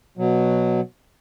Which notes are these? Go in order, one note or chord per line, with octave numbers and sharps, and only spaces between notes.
B2 F#3